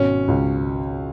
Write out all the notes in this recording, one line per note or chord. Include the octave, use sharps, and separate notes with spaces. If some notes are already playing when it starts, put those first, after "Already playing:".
Already playing: G#1 B2 C#4
C#2